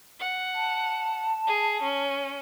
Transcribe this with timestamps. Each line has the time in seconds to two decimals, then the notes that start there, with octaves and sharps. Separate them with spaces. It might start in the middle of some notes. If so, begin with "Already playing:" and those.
0.20 F#5
0.55 A5
1.47 G#4
1.82 C#4